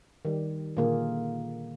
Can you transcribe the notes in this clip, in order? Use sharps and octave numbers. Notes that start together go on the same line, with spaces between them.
D#3 G3
A#2 D3 D#3 A#3 F4 G#4